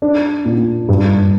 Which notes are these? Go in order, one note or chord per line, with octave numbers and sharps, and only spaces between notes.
D4
A#2
G2